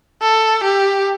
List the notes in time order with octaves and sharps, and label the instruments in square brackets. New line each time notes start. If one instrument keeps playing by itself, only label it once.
[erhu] A4
G4